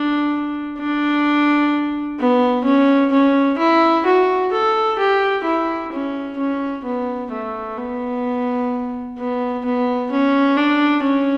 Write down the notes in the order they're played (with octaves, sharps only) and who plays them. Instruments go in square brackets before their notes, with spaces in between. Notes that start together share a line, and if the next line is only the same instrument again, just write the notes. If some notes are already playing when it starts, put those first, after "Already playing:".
Already playing: [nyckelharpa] D4
D4
B3
C#4
C#4
E4
F#4
A4
G4
E4
C#4
C#4
B3
A3
B3
B3
B3
C#4
D4
C#4